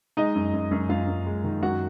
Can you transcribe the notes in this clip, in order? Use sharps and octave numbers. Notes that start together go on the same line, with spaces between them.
G#3 D#4 D#5
F#2
F#2
F#2
F#2 F4 F5
F#2
G#3
D#3
F#2 F#4 F#5